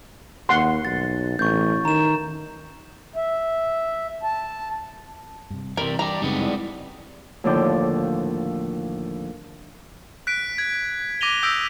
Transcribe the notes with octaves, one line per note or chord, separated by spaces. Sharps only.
D#2 F#5 C6
B1 A6
A1 C#6 G6
D#3 A#5 E7
E5
A5
G2 C3
C3 E3 G3 A#4
G3 D4 G4 A#5
F#2 C#3 G3 G#3 B3 C4 D#4
E4 D5 D#5
D#2 A2 D3 F3 D5 G6
F#6 B6 D7
G#6
D6 A#6 D#7 F7 G7
D#6 E6 G6 A#6 B6 D7